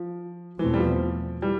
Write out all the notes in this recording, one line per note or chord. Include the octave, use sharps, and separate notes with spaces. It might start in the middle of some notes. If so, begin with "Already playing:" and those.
Already playing: F3
E2 B2 E3 A3 C4
G3
F3
E3 G3